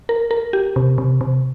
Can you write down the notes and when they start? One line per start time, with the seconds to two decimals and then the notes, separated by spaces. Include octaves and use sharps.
0.09 A#4
0.31 A#4
0.53 G4
0.76 C3
0.98 C3
1.21 C3